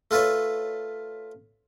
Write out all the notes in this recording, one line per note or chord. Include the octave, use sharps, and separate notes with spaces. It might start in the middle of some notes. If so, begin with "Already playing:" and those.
A3 F4 A4 B4 C#5